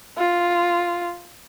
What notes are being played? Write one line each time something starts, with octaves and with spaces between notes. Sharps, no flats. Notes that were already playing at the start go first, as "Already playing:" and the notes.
F4